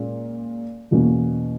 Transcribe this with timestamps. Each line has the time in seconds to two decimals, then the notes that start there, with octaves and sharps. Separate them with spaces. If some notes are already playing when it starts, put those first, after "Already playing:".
Already playing: A#2 G#3 C#4
0.91 E2 B2 A#3 C#4